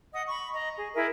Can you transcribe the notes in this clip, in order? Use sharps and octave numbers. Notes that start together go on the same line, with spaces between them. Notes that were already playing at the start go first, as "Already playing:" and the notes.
D#5 F#5 D#6
B5 C#6
D#5 A#5
G#4
E4 G#4 A#4 E5